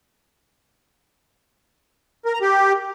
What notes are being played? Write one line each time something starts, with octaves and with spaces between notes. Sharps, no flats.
A#4
A#5
G4